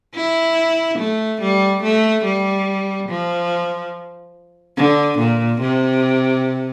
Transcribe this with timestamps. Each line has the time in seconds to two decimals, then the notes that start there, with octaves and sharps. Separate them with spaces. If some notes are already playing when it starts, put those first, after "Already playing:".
0.15 E4
0.98 A3
1.41 G3
1.83 A3
2.24 G3
3.09 F3
4.77 D3
5.19 A#2
5.61 C3